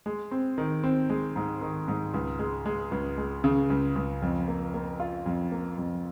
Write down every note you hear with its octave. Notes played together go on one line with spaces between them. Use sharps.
G#3
C4
D#3
C4
G#3
G#2
D#3
G#2
C#2
G#3
G#3
C#2
G#3
C#3
C#2
C#2
F2
A#3
A#3
F4
F2
A#3
F2